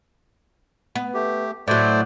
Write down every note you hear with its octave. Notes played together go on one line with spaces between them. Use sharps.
B3
A3 G4
A2 F#3 A3 C5 D5